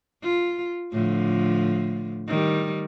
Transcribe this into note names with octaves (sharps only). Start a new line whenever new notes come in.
F4
A2 D3 F3
D#3 G3